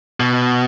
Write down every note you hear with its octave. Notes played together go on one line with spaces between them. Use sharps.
B2